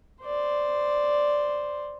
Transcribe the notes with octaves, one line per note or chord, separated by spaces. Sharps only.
C5 D5